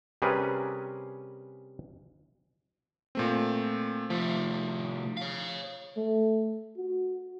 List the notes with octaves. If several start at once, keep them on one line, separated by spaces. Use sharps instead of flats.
C3 G3 C#4 G#4 A#4 B4
A#2 A3 C4
C2 F3 A3
C#5 F5
A3
F#4